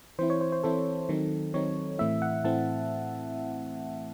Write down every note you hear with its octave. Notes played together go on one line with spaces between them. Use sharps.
E3 C4 E4 C5
C#5
C5
C5
E3 C4 E4 A4
D#3 F#3 C4 D#4
D#3 F#3 C4 D#4 C#5
A2 E3 A3 C4 E4 E5
F#5
A2 E3 A3 C4 E4 A5